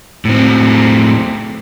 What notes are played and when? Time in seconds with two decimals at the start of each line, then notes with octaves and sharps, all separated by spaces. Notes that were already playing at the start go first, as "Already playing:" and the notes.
0.25 A2 C4